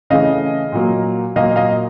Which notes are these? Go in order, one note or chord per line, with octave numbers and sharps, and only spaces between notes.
C#3 E3 A3 C#4 D#5 F5
A#2 F#3 A#3
A#2 F#3 A#3 D#5 F5
D#5 F5